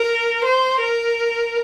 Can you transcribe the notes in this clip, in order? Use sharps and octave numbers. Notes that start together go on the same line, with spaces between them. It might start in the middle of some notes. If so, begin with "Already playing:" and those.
Already playing: A#4
C5
A#4